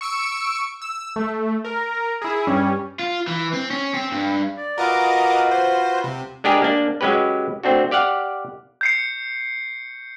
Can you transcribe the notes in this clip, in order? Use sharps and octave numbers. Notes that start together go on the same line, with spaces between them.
C#6 E6 C#7 D7
E6
A3
A#4
E4 G#4
G2 G3 C#4
F4
E3
C4
C#4
C4
G2
D5
F4 F#4 A#4 B4 D#5 D6
C5
C3
G#3 D4 G4 G#4 A#4
A#3 D4
F#3 G#3 C#4 G4 B4
A3 C4 D4 F#4
G4 D5 F5 F#5
G6 C7 C#7